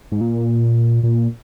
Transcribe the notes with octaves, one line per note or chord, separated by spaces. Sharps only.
G#2
A#2
A#2